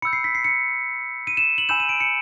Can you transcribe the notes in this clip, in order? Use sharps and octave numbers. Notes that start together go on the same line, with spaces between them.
B5 E6 G6 C#7
C7
B6
C7
C#7
D#7
E7
F#7
G#5 B5 E6 G6 E7
D#7
D7
C#7